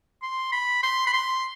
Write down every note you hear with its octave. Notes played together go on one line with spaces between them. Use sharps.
C6
B5
C6
B5
C6